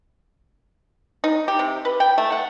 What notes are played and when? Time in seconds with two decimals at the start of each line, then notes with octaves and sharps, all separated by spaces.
1.24 D#4
1.48 G4
1.59 C3
1.85 B4
2.00 G5
2.18 A3
2.32 F#5